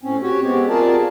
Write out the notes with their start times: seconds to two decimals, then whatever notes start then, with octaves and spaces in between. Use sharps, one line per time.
0.03 A2 C4 C#4
0.22 F#4 G4 C#5
0.42 G#3 B3 C4 G4
0.69 F4 G#4 A#4 D5 A5